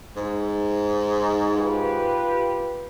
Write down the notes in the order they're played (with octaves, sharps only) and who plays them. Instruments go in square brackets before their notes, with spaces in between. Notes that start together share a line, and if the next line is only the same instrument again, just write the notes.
[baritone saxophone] G#2
[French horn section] F4 G4 B4